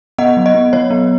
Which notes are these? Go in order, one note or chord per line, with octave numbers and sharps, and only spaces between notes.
B3 D#5 F#5
F#3
D#5
B3
F#3 C#5
B3